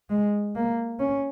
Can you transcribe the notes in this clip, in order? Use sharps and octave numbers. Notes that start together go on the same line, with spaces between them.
G#3
A#3
C#4